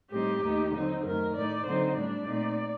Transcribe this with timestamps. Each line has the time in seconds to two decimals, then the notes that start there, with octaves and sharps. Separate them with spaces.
0.12 A2 G3 C4 D#4 G4
0.42 D#2 D#3 A3 D#4
0.73 D3 F#3 C4 D#4
1.03 F#2 D#3 A3 A#4
1.34 A2 A3 D#4 D5
1.65 D3 F#3 C4 D#4 C5
1.96 A2 G3 D4 D5
2.26 A#2 A3 C4 D#4